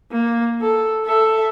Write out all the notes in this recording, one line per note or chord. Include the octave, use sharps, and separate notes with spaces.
A#3
A4
A4 E5